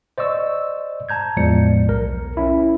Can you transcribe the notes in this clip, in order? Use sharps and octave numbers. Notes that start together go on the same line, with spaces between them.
C5 D5 D#5 C#6 E6
A5 A#5 G6 G#6
E2 A2 F3 G#3 D5 C#7
B1 A#4
C#4 E4